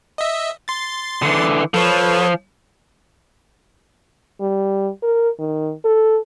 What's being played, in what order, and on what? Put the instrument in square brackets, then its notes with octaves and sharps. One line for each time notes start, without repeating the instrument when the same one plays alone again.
[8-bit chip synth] D#5 E5
C6 A6
[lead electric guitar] D3 E3
[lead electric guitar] F3 [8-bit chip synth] A4 B4 C#5
[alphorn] G3
A#4
D#3
A4